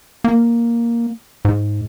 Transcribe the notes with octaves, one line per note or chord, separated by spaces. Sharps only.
A#3
G#2